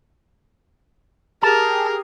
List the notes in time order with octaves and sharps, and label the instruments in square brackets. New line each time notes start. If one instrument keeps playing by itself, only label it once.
[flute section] G4 G#4 [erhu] A#4 [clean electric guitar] A5